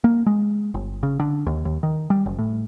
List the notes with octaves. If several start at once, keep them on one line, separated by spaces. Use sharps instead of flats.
A#3
G#3
G1
C#3
D3
D#2
D#2
D#3
G3
F#1
A2